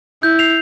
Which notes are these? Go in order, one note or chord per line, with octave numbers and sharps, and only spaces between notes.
E4 G6
C7 F7